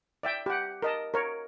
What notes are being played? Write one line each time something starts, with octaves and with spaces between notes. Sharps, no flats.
D5 E5 G5
G4 F#5
A#4 D#5 A5
A#4 C#5